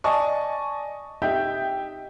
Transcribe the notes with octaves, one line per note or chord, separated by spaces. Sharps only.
D5 D#5 G#5 A5 C#6
D#4 G4 E5 G5 G6